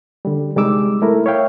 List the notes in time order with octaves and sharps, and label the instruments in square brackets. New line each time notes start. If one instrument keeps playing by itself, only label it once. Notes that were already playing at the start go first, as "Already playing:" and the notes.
[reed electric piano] D3 G3
C3 G3 G#3 D#4 D6 E6
A3 E4 A#4
C#5 E5 F5 G5